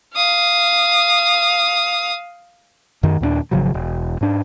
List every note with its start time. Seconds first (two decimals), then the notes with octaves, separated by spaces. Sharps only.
0.14 F5 D#6
3.03 F#2 D#3
3.21 D#2 A#2 A3 D4
3.51 G#1 C#3 F3 F#3
3.74 E1
4.21 G#2 D4